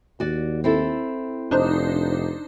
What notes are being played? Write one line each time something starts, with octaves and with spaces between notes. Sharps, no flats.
D#2 F#4 D5
C4 E4 A4
F1 D4 D#4 C5